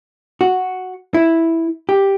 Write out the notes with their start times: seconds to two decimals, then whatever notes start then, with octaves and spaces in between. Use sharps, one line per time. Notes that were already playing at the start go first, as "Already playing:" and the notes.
0.41 F#4
1.14 E4
1.89 G4